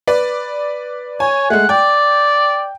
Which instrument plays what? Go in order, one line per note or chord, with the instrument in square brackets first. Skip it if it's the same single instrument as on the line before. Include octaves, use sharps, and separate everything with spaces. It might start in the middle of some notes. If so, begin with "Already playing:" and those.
[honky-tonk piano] B4 D5
[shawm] C#5 [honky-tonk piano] G#5
[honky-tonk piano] G#3 A3 [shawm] F#5
[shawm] D5 [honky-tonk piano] G5